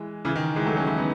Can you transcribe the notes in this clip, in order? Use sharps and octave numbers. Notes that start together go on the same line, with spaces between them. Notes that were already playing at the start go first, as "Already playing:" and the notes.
Already playing: E3 G#3
C#3 E3
D#3
E3 G#3
F#3 A3
A3 C#4
C#4 E4
B3 D#4